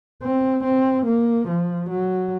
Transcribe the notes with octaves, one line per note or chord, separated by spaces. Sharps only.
C4
C4
A#3
F3
F#3